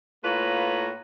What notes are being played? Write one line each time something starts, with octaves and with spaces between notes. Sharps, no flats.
A2 A#3 F4 B4 C#5 A#5